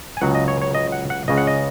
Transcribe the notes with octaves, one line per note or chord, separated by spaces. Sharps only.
G#5
C#2 C#3 F#3 F#5
D#5
C#5
C#5
D#5
F#5
F#5
C#2 C#3 G#3 D#5
F#5
D#5